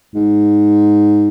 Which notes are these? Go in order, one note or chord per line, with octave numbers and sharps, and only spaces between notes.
G#2